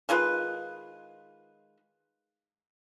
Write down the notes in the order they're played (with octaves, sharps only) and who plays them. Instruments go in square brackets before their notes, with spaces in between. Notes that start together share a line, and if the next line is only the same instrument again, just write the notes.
[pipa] D#3 G#3 F4 B4